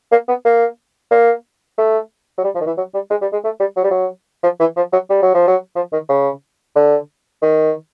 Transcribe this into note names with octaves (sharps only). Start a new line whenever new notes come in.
A#3
B3
A#3
A#3
A3
F#3
G3
F3
D#3
E3
F#3
G3
G#3
G3
G#3
A3
G3
F#3
G3
F#3
F3
E3
F3
F#3
G3
F#3
F3
F#3
F3
D#3
C#3
D3
D#3